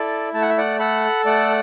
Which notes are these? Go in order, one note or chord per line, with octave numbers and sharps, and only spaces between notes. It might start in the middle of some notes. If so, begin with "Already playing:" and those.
Already playing: E4 A4 D5
A3 A5
F#5
E5
D5 F#5
A4 F#5 B5
A3 D5 F#5